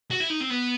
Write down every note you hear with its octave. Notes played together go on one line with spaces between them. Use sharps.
F#4
E4
D#4
C4
B3